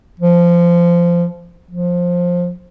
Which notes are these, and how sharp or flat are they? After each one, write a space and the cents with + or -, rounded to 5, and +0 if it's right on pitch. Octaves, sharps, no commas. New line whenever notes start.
F3 -15
F3 +15